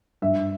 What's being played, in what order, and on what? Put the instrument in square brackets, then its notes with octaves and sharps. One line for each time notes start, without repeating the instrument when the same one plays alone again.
[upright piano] G2 E5